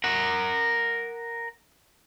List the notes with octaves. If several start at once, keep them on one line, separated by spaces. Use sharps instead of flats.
A#4 F#5